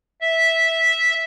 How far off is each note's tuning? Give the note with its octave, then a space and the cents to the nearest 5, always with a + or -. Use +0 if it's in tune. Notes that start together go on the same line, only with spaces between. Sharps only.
E5 -10